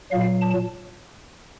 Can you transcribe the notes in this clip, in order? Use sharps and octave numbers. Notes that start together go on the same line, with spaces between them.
A#2 F#3 F5
A5